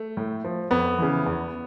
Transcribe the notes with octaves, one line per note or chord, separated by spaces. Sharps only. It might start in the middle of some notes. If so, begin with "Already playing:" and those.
Already playing: A3
A2
F3
F2 B3
C#3 E3
E2